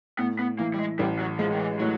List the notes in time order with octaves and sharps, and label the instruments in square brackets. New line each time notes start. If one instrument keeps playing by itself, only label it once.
[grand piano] A2 [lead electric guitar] B3
[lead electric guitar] B3
[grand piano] E3 [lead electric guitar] A#3
[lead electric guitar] G3
G#3
[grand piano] A1 [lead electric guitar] G3
[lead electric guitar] F#3
[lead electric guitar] F3 [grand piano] G#3
[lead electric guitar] D#3
E3
[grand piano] A2 [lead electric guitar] F#3